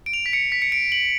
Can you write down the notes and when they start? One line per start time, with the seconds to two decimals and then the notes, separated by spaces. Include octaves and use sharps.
0.06 D7
0.13 F7
0.26 B6
0.33 C#7
0.52 B6
0.62 C#7
0.72 D7
0.92 F#7